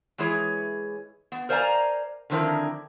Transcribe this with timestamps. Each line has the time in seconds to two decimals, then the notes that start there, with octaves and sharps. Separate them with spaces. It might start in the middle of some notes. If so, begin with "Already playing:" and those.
0.18 E3 G#3 E4 G#4 C#5
1.32 B3
1.49 A#4 C5 D5 F5 G#5 A#5
2.30 D3 D#3 F3 C4 E4 A#4